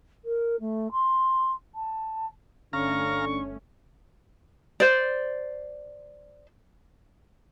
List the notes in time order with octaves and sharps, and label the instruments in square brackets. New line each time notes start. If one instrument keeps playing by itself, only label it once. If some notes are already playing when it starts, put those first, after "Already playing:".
[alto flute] A#4
A3
C6
A5
[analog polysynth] G1 A3 C#4 [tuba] D3 [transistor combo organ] F5 A#5 [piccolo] C#6
[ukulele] C5 D5